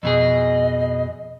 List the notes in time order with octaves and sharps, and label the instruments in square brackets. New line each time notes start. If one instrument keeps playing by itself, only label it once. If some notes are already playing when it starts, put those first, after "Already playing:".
[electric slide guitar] F2 B2 G#4 [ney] D#5